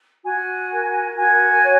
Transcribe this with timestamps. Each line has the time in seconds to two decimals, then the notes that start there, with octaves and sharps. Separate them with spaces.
0.24 F#4 G#5
0.70 A#4
1.17 F#4 G#5
1.63 C#5